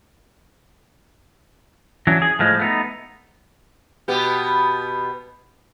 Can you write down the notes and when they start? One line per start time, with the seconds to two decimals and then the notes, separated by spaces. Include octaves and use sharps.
2.07 E3 F#3 C#4 D4
2.22 G#4
2.39 A2 F3 G#3
2.59 A3 B3 D#4
4.08 B2 B3 G4